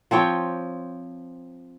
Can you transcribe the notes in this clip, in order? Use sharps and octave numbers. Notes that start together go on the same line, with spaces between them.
F3 C4 C#5 G5